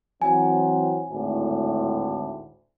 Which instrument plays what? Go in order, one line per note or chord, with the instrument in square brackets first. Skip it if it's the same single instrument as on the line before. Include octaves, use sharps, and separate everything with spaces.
[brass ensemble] E3 F#3 C4 [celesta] G#5
[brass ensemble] G#1 D2 A2